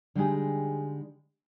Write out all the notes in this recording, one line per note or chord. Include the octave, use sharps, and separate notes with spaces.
D3 G3 G#3 D#4 G4 G#4